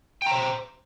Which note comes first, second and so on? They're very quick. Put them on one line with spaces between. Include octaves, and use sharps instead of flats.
G5 A#5 C5